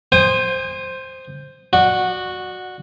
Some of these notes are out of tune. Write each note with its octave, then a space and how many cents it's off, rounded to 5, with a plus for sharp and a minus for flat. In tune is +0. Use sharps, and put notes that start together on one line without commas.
C5 +0 G#5 -45 D#6 -15
F#4 -10 D5 +25